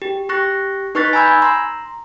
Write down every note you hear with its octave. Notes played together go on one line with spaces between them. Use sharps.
G4
G4 C#6 F#6 A#6
D#4 B4 C#6 F#6 A6 B6
G#5 A#5 B5 E6 G6 G#6
A#5 C6